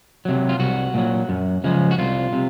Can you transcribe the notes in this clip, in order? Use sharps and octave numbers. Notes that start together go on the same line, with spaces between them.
C3 F#3
F4
C2 F#4
A#2 F#3
F#2
C#3 F3 G#3
F#4
C2 F4
C3